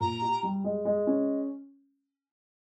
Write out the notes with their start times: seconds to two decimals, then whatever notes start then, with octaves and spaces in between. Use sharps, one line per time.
0.01 A#2 A#5
0.22 G4
0.43 G3
0.64 G#3
0.85 G#3
1.07 C#4